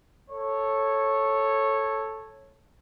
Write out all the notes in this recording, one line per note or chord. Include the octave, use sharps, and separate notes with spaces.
A4 C#5